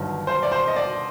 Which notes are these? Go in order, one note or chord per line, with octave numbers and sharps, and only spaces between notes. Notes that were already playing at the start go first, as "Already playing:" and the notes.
Already playing: G1 G2 D#3 F#3
C5
D5
C5
D#5
D5